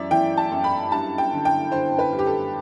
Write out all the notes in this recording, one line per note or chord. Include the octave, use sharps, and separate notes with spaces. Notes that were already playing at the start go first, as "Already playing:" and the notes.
Already playing: F#2 E3 D5 E5
E3 G5
A5
F#2
B5
G2 A5
G5
D3
G5
D3 C5
B4
G2
G4
A4